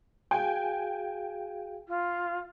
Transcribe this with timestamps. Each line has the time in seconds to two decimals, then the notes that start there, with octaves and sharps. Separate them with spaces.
0.31 F#4 G#4 F5 G5 G#5
1.88 F4